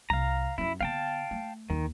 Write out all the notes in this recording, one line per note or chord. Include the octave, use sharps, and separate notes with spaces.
C2 F5 A#5
F#2 C#4 E4
D3 B3 F5 G5 A5
A3
D#2 D#3